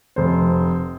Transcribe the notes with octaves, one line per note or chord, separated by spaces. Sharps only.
F1 C5